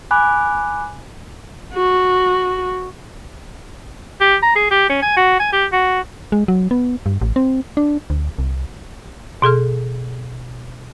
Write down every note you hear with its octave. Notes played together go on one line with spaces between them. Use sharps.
G#5 B5 D6 F#6
F#4
G4
A#5
G#4
G4
C#4
G#5
F#4
G#5
G4
F#4
G#3
F#3
B3
G2
A1
C4
D4
D2
C2
B2 G#4 A4 F6